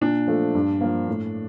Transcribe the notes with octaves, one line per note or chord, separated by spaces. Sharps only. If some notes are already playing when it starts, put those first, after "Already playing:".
A#2 D4
F3 A3
G2
F3 A#3
A2